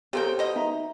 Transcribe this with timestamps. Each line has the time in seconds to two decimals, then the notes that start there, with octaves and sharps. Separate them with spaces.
0.13 C#3 C4 G4 A4 A#4 G5
0.39 B2 D#5
0.56 D#4 E5 A#5